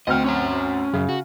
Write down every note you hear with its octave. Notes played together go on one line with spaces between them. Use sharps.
D2 C4 D#5 G5 F6
C#4 C#5 A#5
F#2 C#3
F#4